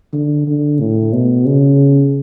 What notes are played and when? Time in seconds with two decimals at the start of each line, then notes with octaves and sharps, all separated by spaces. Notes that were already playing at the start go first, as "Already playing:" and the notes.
0.13 D3
0.47 D3
0.80 A2
1.13 B2
1.46 C#3